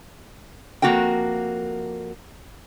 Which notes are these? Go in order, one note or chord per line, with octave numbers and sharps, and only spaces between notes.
F2 G#3 A#3 F#4 A#4 G5